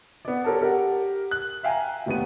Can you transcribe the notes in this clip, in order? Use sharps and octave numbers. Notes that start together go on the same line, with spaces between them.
B3 D5
G4 A4 A#4 C#5 A5
G4 A#4 F#5
F#6
E5 F5 G5 G#5 A#5
F1 D#2 B3 D#7